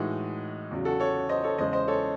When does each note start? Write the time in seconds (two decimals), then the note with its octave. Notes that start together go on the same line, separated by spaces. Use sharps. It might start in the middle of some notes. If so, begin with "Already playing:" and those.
Already playing: A2 E3 G#3 D#4 F#4
0.71 E2 C#3 F#3
0.85 F#4 A4
1.00 A4 C#5
1.29 C5 D#5
1.44 A4 C#5
1.58 E2 C#3 G#3 C5 D#5
1.73 C5 D#5
1.88 A4 C#5